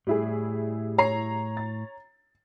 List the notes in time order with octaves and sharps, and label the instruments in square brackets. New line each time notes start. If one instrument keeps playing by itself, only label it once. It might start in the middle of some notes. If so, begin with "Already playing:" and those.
[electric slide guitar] A2 [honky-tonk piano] G3 E4 G#4
[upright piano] C#5 A#5 C7
[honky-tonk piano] A6